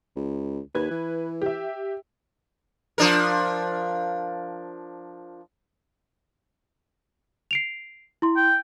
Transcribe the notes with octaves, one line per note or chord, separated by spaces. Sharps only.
C#2
D#2 B4 G#6
E3
G4 E5
F3 D4 A#4
C7 D7 F7
E4 C6
G5